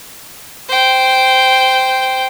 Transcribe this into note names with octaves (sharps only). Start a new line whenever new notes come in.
C5 G5